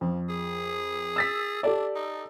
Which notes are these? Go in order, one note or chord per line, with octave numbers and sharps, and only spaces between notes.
F2 F3
G#4
E6 A6 B6
D4 G4 A4 D5
D#4